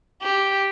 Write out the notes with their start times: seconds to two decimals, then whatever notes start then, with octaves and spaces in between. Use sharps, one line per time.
0.23 G4